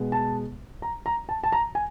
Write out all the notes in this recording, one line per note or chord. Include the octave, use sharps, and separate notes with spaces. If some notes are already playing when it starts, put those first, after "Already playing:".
Already playing: B2 G#3 B3
A5
A#5
A#5
A5
A5
A#5
G#5